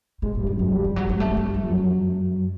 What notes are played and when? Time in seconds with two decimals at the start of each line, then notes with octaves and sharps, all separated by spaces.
0.22 G#2 B2 G#3
0.35 C3
0.39 G2 G3
0.47 C3
0.55 F#2 C#3 F#3
0.65 G#3
0.72 G2 G3
0.85 F3
0.96 F#3
1.09 G#3
1.20 A3
1.37 A#3
1.54 G#3
1.63 F3
1.69 F#2 F#3